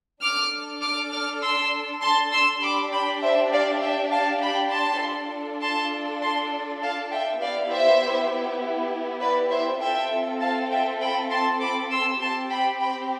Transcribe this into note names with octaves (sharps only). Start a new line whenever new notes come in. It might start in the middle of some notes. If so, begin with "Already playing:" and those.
D4 A4 D6 F6
D6 F6
D6 F6
C6 E6
A5 C6
C6 E6
D4 G4 B5 D6
G5 B5
C5 E5
D5 F5
E5 G5
F5 A5
G5 B5
A5 C6
D4 F4 A4
A5 C6
A5 C6
F5 A5
E5 G5
B3 E4 G4 D5 F5
C5 E5
B4 D5
C5 E5
C4 F4 A4 E5 G5
F5 A5
E5 G5
G5 B5
A5 C6
B5 D6
C6 E6
C4 G4 A5 C6
G5 B5
G5 B5